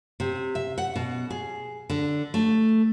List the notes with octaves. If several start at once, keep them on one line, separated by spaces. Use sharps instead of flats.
C3
E5
F#5
B2
G#4
D3
A3